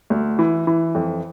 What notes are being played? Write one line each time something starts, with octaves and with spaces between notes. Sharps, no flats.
D2
E3
E3
F2